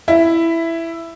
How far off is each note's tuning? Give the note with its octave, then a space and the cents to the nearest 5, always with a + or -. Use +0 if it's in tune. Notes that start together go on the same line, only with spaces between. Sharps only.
E4 +5